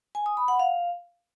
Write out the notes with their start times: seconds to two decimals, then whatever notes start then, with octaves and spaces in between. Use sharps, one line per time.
0.15 G#5
0.26 D#6
0.37 B5
0.48 F#5
0.59 F5